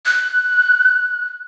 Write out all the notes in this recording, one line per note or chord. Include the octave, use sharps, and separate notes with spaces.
F#6